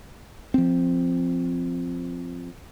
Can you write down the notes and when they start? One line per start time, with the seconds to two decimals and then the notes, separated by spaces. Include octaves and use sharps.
0.54 F3 C4